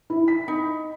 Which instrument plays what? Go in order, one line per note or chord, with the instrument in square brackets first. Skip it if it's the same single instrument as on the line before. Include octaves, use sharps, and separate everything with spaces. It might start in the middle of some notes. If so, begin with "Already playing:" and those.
[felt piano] E4
B6
[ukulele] D#4 [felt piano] B5